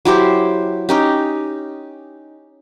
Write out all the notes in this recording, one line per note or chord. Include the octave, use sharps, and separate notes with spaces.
F#3 E4 G4 C5
C#4 D#4 G4